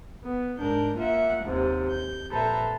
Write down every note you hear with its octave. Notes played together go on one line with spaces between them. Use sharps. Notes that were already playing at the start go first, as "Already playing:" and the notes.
B3
G#2 D4 A#4 G6
A#3 F4 E5 F#5
D#2 G#2 C3
G6
A#2 A4 B4 C5 E5 A#5